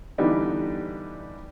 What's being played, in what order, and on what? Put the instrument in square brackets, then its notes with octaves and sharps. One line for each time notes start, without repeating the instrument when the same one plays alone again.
[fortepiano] D3 E3 G3 B3 D#4